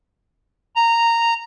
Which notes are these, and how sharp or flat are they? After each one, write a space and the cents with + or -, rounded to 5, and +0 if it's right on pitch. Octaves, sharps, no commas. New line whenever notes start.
A#5 -10